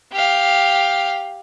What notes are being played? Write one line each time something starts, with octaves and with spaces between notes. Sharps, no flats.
G4 F5